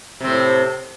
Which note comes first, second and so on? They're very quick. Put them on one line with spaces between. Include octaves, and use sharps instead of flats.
C3 C4 A2